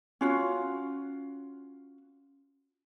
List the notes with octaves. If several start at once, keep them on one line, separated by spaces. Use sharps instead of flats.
C#4 F4 F#4